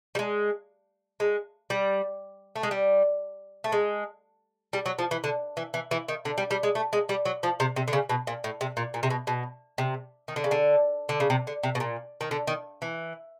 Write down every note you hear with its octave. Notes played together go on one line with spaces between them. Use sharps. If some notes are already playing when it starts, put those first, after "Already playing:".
G3
G#3
G#3
G3
A3
G#3
G3
A3
G#3
G3
F#3
F3
E3
D3
E3
E3
E3
D#3
D3
G3
G3
G#3
A3
G#3
G3
F#3
F3
C3
C3
D3
C#3
B2
A#2
A2
C3
A#2
A#2
C3
B2
B2
C3
D#3
D3
C#3
D3
D3
C#3
C3
D3
C3
B2
A#2
D#3
D3
D#3
E3